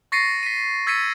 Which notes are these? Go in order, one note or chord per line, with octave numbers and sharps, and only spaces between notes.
C#6 A6 A#6 C7 C#7 D#7
B6 D#7
E6 G#6 A6 B6 C#7 D#7